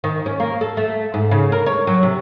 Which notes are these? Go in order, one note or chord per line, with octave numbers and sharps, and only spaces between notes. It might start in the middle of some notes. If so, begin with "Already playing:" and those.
D#3
C#4
A#3
A4
A3
G#2
C#3
A#4
C#5
F#3
C3